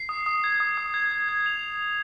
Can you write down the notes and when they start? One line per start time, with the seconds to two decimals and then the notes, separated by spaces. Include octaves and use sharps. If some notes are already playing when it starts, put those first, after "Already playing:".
Already playing: C7
0.09 D#6
0.26 D#6
0.44 G#6
0.60 D#6
0.78 D#6
0.94 G#6
1.11 G#6
1.29 G#6
1.46 F7